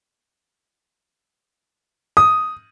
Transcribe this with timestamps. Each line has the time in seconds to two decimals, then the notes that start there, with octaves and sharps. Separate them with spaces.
2.17 D#6